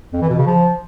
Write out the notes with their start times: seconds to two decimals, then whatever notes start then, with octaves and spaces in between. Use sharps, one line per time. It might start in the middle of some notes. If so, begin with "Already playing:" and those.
0.13 F2
0.21 E3
0.30 B2
0.38 C#3
0.46 F3